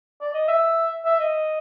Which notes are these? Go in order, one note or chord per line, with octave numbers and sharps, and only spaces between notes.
D5
D#5
E5
E5
D#5